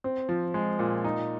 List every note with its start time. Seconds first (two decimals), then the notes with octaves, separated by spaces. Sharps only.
0.04 C4
0.29 F3
0.54 G#3
0.79 A#2
1.04 D#4